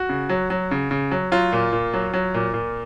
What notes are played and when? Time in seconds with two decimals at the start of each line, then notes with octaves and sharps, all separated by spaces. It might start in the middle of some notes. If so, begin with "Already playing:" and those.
Already playing: F#4
0.09 C#3
0.29 F#3
0.50 F#3
0.71 C#3
0.91 C#3
1.11 F#3
1.32 F#3 F4
1.52 A#2
1.73 A#2
1.94 F#3
2.14 F#3
2.34 A#2
2.54 A#2